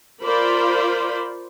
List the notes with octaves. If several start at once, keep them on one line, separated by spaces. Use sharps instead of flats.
F4 A#4 C5 D5 B5